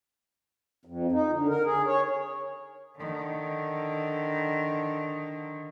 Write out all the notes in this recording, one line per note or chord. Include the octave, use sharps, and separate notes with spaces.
F2
D#4
D3
A#4
G#4
C#5
D3 D#3